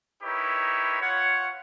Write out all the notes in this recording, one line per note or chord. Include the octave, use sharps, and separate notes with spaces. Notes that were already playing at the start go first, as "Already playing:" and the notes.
D#4 E4 G4 A#4 B4 C#5
F4 C#5 F#5